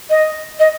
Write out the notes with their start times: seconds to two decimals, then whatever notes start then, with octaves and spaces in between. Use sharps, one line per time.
0.10 D#5
0.60 D#5